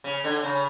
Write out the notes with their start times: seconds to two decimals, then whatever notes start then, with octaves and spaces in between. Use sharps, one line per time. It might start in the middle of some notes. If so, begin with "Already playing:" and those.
0.04 C#3
0.24 D3
0.43 C#3